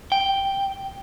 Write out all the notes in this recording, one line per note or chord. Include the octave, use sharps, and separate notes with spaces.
G5